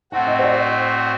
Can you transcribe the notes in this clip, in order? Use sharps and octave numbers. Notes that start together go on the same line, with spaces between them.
A2 A3 C4 F#4 F#5
D#5
C5
D5